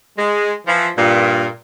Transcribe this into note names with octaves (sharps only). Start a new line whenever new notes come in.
G#3
E3 F3
G2 A#2